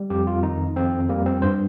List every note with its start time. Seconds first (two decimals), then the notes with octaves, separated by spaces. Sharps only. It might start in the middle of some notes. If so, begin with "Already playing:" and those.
Already playing: G3
0.10 F2 G4
0.27 F4
0.43 D#3 D#4
0.76 F2 C4
1.09 G3 A#3
1.26 C4
1.42 G2 C5